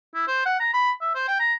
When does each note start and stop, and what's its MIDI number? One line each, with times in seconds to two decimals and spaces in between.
0.14 0.23 64
0.27 0.43 72
0.45 0.57 78
0.60 0.73 82
0.74 0.91 83
1.01 1.14 76
1.15 1.26 72
1.28 1.38 79
1.40 1.54 82